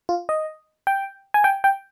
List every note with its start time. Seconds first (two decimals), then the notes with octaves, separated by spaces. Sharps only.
0.09 F4
0.29 D#5
0.87 G5
1.34 G#5
1.44 G5
1.64 G5